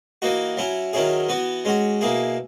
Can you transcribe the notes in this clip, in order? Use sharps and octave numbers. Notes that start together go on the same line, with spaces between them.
E3 A#3 D#4 F#4
F#3 C#4 E4
D#3 F#3 C#4 E4 G#4
E3 B3 F#4
G#3 C#4 F#4
B2 A#3 E4 G#4